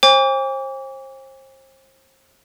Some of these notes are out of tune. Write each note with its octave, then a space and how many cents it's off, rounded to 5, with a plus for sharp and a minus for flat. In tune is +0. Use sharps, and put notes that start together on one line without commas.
C5 +35 G#5 -45 D6 -35